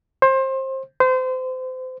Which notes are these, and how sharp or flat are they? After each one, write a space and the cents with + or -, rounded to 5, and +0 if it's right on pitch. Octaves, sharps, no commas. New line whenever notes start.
C5 +25
C5 -30